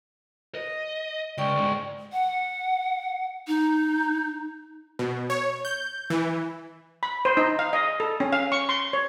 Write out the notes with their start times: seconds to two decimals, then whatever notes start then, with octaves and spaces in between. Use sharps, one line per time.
0.55 D#5
1.38 C#2 D5 G5 C#6
1.56 D2 G#2
2.12 F#5
3.47 D#4
4.99 B2
5.30 C#5
5.65 G6
6.10 E3
7.03 B5
7.25 C5
7.37 D#4
7.59 F5
7.73 D#5
8.00 A4
8.20 C#4
8.32 F5
8.52 C#6
8.69 C6
8.93 C#5